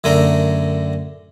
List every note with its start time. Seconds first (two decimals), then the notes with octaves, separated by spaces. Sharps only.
0.04 F#2 D3 A3 A#4